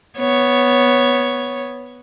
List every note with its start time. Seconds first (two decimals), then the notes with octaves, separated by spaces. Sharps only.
0.19 B3 C#5